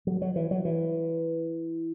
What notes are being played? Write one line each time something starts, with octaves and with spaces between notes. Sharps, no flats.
F#3
F#3
E3
F#3
E3